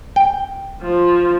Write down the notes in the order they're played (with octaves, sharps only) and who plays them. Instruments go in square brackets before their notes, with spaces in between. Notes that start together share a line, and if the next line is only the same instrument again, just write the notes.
[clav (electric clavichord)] G5
[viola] F3